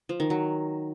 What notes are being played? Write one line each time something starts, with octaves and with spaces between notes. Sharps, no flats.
F3
D#3
F#3